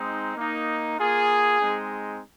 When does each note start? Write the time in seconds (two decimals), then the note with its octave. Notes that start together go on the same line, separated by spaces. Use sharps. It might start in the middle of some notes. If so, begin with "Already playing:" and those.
Already playing: G#3 C4 D#4
0.36 A#3 D#4
0.98 A#3 F4 G#4
1.60 G#3 C4 D#4